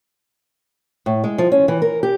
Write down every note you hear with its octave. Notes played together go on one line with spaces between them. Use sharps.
A2
G#3
F3
C#4
E3
A#4
G4